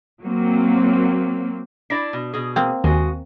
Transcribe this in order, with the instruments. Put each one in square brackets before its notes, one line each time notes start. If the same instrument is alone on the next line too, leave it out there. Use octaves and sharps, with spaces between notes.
[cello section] F#3 A#3 C4
[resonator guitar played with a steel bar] D4 E4 D5 [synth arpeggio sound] A#6
[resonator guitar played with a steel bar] B2
B2 G#4
[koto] A#3 C4
[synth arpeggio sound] D#2 D#3 G#5 [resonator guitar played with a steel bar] G#3 F#4